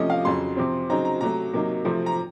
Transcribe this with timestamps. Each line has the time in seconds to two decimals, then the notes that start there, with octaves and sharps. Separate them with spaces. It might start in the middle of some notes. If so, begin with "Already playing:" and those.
Already playing: C3 F3 A3 C#4 D#5
0.10 F5
0.25 F2 C#3 F#3 C6
0.57 C3 F3 C4
0.90 C#3 F#3 C4 D#4 A#5
1.05 A#5
1.21 C3 F#3 A3 A#5
1.53 C3 F#3 A#3 D#4
1.85 C3 F3 A3 C4
2.06 A#5